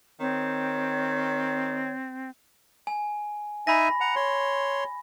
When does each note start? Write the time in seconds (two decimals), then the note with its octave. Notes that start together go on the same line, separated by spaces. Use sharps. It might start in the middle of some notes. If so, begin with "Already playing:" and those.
0.20 D#3 C4 C#5
2.87 G#5
3.67 D#4 E5 G#5 B5 A#6
4.00 F#5 A#5
4.16 C#5 C6